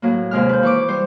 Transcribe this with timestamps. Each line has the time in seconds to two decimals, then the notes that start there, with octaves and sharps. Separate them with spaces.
0.02 A2 F#3 A#3
0.31 D#2 C3 G#3 F6
0.49 B4 G6
0.63 E3 C#6 D6
0.89 G3 C5